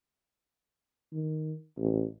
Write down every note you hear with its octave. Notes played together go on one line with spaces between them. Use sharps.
D#3
A1